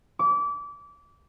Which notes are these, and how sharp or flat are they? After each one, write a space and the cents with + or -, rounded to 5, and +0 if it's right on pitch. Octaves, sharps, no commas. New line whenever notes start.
D6 -25